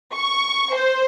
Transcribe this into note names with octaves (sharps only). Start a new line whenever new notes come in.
C#6
C5